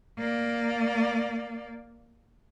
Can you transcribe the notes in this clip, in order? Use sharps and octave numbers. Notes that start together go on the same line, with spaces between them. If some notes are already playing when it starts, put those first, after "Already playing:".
A#3 D5